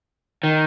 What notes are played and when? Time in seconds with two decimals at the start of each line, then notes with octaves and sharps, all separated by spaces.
0.43 D#3